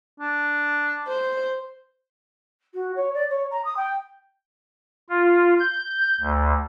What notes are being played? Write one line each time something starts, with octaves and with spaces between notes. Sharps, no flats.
D4
C5
F#4
C#5
D5
C#5
A#5
D#6
G5
F4
G6
D2